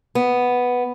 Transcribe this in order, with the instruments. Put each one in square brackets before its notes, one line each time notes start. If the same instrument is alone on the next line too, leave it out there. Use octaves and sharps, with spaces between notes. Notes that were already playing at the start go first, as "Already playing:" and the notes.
[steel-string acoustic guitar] B3